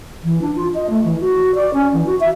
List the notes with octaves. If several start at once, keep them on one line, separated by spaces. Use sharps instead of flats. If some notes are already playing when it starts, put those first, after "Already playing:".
E3
D4
F4
D#5
A3
E3
F#4
D5
C#4
E3
F#4
E5